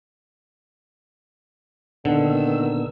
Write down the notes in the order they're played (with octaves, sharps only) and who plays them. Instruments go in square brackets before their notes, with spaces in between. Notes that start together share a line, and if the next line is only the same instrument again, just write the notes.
[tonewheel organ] A#2 B3 E6 [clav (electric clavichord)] D3 [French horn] D#3